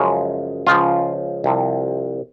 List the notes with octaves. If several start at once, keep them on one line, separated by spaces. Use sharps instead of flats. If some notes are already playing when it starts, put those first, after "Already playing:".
Already playing: F#2 C#3 F3 G#3
C#2 C#3 F3 F4
C2 C3 F3